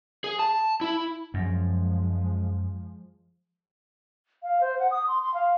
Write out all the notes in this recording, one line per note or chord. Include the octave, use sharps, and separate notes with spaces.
G#4
A5
E4
F#2 F3 G#3
F5
C5
F#5
D#6
C6
C6
F5